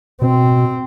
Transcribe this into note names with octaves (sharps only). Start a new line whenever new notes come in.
B2 C4